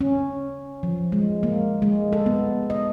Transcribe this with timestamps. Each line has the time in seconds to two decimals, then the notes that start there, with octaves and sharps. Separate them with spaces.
0.01 C#4
0.83 F3
1.12 G#3
1.43 A#3
1.82 G#3
2.13 A4
2.26 B3
2.70 D#5